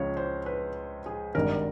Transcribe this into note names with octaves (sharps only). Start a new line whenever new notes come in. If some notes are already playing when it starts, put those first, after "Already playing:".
Already playing: C#2 C#3 F3 C#5
C5
B4
G#4
G#1 G2 D#3 A#4